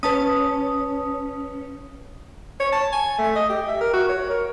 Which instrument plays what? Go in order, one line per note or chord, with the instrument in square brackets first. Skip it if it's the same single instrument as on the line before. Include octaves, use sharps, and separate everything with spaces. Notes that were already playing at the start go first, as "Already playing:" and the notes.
[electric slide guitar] C#4 [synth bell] B4 A5 D#6
[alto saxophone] C#5
A5
G#5
A3
D#5
G4
E5
A#4
F#4
C#5
A#4